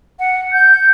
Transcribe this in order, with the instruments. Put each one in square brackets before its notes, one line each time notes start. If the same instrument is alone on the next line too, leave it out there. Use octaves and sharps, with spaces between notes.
[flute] F#5
G6